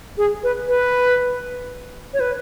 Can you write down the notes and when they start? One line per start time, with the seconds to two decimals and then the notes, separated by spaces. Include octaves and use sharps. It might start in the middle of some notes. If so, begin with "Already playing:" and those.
0.18 G#4
0.43 B4
0.68 B4
2.14 C#5
2.20 B4